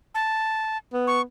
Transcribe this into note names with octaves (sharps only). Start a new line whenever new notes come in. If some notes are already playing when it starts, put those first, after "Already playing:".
A5
B3
C#6